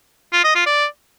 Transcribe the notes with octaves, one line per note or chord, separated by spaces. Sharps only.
F4
D#5
F4
D5